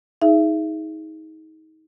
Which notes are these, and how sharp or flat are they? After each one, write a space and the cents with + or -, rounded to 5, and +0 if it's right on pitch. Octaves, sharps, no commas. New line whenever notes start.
D#4 +30 G#4 +0 E5 +30